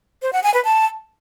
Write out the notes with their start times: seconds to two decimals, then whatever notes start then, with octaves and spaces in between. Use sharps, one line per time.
0.22 C5
0.33 F#5
0.43 G#5
0.54 B4
0.65 A5